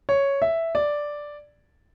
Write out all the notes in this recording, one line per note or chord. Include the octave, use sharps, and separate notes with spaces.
C#5
E5
D5